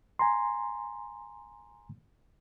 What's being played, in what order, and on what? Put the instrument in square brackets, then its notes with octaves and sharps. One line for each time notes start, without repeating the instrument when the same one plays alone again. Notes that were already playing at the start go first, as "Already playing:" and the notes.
[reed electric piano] G#5 A#5 C6